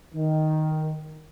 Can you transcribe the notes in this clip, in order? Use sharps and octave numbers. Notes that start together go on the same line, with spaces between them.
D#3